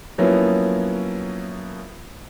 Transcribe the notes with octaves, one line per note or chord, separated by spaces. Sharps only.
F3 F#3 A#3 B3 C#4 E4